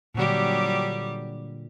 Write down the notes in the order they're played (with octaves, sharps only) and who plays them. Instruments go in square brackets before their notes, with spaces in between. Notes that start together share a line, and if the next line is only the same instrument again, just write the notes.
[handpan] A#2 D3 [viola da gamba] F#3 G3 G4